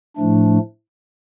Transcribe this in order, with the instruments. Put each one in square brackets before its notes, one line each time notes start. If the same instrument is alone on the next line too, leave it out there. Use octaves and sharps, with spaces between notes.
[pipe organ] A2 F3 A3 D4